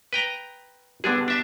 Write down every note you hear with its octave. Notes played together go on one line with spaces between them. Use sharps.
B4 G5 A#5
D3 G3 B3 D4 G#4
D4 E5 A5